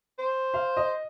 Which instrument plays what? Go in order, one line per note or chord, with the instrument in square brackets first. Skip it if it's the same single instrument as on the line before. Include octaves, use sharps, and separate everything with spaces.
[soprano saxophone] C5
[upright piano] F5
D#5